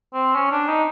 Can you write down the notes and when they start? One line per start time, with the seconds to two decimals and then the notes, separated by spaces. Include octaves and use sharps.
0.13 C4
0.36 C#4
0.52 D4
0.69 D#4